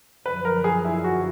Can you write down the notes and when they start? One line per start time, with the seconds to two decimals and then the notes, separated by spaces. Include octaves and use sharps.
0.25 F#2 D3 F3 B4
0.45 A#4
0.64 G#4
0.85 E4
1.04 F#4